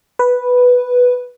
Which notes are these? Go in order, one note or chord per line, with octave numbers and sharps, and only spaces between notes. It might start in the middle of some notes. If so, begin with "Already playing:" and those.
B4